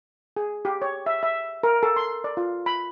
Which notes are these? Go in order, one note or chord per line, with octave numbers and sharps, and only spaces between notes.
G#4
G4
C#5
E5
E5
A#4
A4
C6
D5
F4
B5